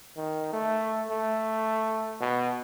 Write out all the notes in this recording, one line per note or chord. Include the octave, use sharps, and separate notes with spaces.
D#3
A3
A3
B2